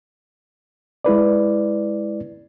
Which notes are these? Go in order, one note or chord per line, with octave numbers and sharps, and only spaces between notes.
G#3 E4 B4 D5